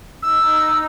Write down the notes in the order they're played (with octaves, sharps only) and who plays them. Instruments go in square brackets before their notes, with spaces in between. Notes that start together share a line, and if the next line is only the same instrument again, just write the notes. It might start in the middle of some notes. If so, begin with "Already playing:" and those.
[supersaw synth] D#4 [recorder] E6